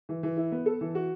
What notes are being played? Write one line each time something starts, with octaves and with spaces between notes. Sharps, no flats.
E3
E3
E4
B3
A4
E3
F#4